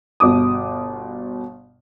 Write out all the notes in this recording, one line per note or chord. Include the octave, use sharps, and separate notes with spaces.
G1 B2 D6 D#6